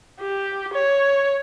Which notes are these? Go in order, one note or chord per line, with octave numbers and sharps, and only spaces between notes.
G4
C#5